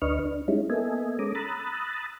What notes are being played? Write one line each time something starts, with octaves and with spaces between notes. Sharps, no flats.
D2 D4 B4 D#5 C#6 F6
D4
G3 G#3 C#4 D#4 E4
A#3 B3 A4 D#5 E5 G#5
G#3 C#4 A4 A#5 D6 D#6
A#5 B5 D#6 E6 F#6 A6